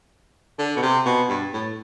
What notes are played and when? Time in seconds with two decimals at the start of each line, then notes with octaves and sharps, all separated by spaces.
0.58 D3
0.76 B2
0.83 C3
1.05 B2
1.29 G2
1.53 A2